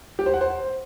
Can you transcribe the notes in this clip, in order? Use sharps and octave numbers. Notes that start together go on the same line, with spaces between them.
G4
C5
F#5
C5